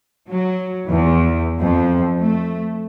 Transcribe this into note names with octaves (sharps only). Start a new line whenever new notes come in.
F#3
E2
F2
A3